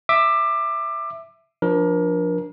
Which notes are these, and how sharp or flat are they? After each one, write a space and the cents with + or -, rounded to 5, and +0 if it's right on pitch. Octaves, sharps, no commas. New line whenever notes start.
E5 +0 D6 +20
F3 +10 D4 +0 A#4 +30